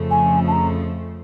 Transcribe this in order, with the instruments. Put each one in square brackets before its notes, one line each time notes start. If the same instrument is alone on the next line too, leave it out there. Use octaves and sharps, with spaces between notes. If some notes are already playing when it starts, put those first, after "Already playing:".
Already playing: [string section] F2 C#3 F3 A3
[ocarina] G#5
A5
A#5